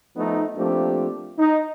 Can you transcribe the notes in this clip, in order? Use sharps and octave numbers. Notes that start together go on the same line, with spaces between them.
F3 A3 B3 D#4
F3 A3 A#3 C4 D4 G4
D#4